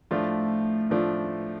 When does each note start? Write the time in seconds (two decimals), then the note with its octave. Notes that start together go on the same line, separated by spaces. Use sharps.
0.11 A2 F3 A3 D4 F4
0.90 A2 F3 A3 D4 F4